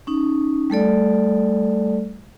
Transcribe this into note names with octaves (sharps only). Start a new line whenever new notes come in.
C#4 D#4
G3 A3 A4 D5